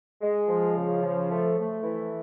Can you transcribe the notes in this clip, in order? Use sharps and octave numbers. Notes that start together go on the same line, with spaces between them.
G#3
F3
C#3
F3
A3
A3
E3